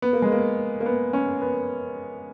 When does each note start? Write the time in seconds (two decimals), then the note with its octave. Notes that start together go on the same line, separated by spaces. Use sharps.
0.02 B3
0.13 A#3
0.22 G#3
0.32 A#3
0.81 A#3
0.86 B3
1.13 C#4
1.41 B3